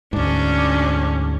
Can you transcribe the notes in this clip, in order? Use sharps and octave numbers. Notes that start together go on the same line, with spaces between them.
D2 G#2 C#4 D4